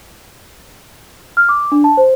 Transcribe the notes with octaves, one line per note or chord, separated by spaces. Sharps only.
F6
D6
D4
A5
C5